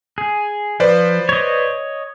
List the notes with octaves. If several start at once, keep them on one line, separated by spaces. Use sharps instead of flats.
G#4
F3 B4 C5 D5
C#5 D#5